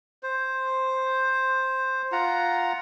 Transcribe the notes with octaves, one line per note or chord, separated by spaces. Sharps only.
C5
F4 F#5 A#5